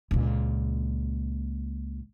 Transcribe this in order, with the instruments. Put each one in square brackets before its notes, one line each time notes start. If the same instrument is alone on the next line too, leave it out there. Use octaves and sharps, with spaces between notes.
[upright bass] C#2 A#2